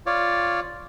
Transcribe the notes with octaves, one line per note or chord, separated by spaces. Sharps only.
F4 C#5 D5